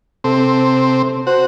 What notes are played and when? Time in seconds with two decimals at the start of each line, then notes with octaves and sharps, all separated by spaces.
0.24 C3 C4 A4
1.27 F#4 C5